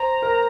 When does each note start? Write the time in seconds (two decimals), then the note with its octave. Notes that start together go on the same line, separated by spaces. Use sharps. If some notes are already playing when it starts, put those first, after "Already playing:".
Already playing: C5 A#5
0.22 A#4